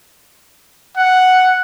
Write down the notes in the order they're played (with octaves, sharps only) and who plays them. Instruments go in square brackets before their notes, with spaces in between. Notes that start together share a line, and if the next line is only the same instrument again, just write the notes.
[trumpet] F#5